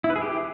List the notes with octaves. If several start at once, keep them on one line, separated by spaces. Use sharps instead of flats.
E4
B4
G#4
G4